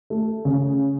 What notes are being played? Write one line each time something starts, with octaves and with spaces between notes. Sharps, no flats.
A3
C#3